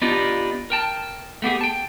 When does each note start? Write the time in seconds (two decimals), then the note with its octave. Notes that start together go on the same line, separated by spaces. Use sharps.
0.02 B3 D4 D#4 F4 G4
0.70 A#4 G5 A5
1.42 A3 B3 G4 G#4
1.61 G5 A5